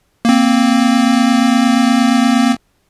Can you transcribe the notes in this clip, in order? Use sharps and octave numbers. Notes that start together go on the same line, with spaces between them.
A#3 C4